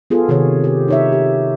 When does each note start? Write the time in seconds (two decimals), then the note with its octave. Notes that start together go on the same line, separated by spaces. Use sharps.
0.10 B3 F4 G#4 A4
0.29 C3 D#3 F4 G#4 C#5
0.64 G4
0.88 D#4 C#5 E5
1.12 G4